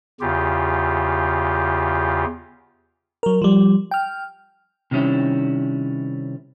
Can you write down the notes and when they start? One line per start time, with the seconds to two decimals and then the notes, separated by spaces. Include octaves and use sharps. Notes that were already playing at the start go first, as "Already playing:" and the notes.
0.21 E2 C#3 F4 G4
3.23 F#3 A#4
3.42 F3 G3
3.91 G5 F6
4.91 C3 D#3 G3 C#4 E4